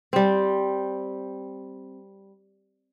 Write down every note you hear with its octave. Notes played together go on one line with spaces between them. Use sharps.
G3 C4